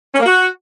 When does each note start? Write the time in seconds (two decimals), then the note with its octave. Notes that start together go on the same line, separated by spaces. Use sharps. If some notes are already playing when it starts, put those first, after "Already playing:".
0.14 C#4
0.19 A#3
0.25 F#4